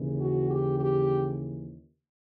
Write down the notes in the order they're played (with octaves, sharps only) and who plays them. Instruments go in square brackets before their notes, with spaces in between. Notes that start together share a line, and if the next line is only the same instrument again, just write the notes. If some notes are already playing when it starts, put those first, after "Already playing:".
Already playing: [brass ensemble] D#2 C#3 E3
F#4
G4
G4